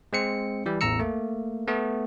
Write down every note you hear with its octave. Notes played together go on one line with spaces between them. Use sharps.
G#3 C4 C#7
E3 G3
A1 E2 A#5 E6 C#7
A3 A#3
A3 B3